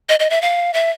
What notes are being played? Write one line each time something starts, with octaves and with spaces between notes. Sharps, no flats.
D#5
D#5
E5
F5
E5